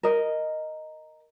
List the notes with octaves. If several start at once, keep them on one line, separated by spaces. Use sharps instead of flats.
A#4 D#5